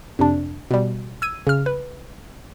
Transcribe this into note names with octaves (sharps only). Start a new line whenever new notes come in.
F2 C3 D4
B2 G3
E6 G#6 D#7
C#3 F6
B4